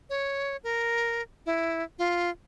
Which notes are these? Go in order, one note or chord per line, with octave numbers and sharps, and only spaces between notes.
C#5
A#4
E4
F4